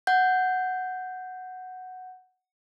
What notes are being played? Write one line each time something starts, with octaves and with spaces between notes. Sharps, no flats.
F#5 G6